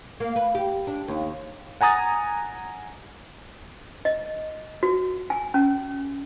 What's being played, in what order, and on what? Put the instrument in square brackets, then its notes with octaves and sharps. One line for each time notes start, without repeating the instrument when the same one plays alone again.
[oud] A#3
B4
G4
D4
D#2
[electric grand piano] F#5 G#5 A#5 D#6 A6
[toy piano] D#5
F#4
G#5
C#4